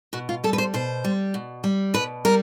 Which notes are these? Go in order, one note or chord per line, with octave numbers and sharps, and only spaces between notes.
B2 F#4
F4
G3 A4
B4
C5
B2 C5
G3
B2
G3
B2 B4
G3 A#4